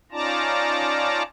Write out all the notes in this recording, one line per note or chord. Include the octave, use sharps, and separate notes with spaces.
C#4 D#4 F4 D5 A5 A#5